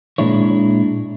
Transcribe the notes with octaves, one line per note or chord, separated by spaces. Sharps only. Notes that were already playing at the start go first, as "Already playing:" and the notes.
A#2 G#3 D4 E4 C#5